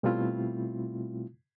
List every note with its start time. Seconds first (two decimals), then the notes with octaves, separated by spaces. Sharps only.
0.03 B2 G3 A3 C4 E4 F4